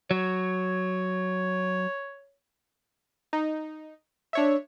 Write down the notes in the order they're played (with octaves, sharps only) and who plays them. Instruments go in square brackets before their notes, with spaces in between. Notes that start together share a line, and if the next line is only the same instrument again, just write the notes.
[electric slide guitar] F#3 [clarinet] C#5
[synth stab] D#4
D4 C#5 E5